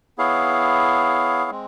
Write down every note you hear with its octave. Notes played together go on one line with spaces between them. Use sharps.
B3 E4 G#4 C#5 F5
G#3 C4